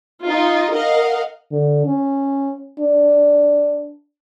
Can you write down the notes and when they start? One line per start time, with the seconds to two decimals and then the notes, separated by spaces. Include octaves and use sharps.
0.25 D#4 F4
0.72 A#4 D#5 F5 F#5
1.51 D3
1.86 C#4
2.80 D4